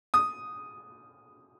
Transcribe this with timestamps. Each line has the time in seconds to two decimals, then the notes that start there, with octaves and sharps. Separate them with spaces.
0.14 D#6